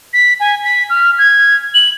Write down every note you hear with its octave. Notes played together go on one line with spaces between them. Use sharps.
B6
G#5
B6
F6
G#6
F#7